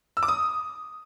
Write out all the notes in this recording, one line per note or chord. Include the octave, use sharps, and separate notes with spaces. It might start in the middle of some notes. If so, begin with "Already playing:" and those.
E6
D6
D#6